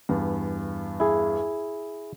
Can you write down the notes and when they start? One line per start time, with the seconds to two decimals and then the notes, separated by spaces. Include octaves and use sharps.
0.09 E2 G2
1.00 E4 G#4